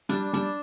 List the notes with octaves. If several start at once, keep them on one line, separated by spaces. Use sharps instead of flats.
G3 D4
G3 D4